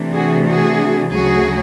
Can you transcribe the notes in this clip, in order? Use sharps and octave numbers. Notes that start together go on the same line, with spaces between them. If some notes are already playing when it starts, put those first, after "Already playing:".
Already playing: C3 E3 A3 D4
F#4 G#4
F#4 G#4
D2 C#3 F#3 A3 F#4 G#4